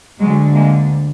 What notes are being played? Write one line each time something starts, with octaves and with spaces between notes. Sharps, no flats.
D2 D3 F#3 G#3
G#3 A#3